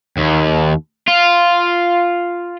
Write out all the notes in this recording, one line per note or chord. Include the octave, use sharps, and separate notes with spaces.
D#2
F4